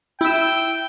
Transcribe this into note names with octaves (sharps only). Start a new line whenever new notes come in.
E4 G5 E6